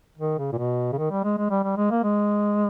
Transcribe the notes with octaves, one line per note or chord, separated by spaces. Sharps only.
D#3
C#3
A#2
B2
C#3
D#3
G3
G#3
G#3
G3
G3
G#3
A#3
G#3